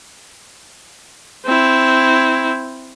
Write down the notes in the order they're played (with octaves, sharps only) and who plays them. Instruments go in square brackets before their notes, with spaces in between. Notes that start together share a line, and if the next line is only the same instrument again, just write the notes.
[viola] C4 E4